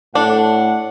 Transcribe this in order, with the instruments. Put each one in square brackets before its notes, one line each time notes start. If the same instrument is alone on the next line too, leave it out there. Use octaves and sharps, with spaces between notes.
[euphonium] A2 [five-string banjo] D4 [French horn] A4 [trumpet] F#5